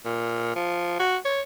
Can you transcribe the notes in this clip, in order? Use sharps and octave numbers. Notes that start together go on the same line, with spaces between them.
A#2
F3
F#4
C#5